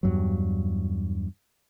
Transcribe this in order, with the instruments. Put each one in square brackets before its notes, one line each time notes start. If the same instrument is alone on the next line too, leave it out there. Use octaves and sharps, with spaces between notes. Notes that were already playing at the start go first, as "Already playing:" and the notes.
[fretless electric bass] E2 G2 F#3